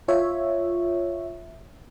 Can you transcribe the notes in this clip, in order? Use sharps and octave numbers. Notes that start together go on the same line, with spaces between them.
F4 C#5 E5